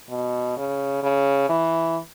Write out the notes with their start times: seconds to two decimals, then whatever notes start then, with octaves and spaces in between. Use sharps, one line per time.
0.10 B2
0.57 C#3
1.03 C#3
1.49 E3